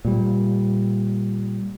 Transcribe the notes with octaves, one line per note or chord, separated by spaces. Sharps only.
A#2 G3